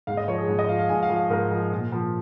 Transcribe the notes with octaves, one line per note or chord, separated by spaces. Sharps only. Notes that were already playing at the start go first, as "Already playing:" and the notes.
G#2 F5
D#5
F3 C#5
G#4
G#2
D#5
F3 F5
F5
G#2 G#5
F5
F3
F5
G#2 A#4
F3
A#2
F3